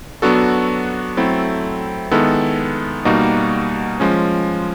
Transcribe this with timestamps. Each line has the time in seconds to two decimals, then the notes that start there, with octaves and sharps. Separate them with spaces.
0.22 F#3 B3 D4 F#4 A4
1.17 F#3 A3 C4 E4 A4
2.11 D#3 G#3 B3 E4 A4
3.05 B2 G3 A#3 D#4 F#4
4.00 F3 G#3 C#4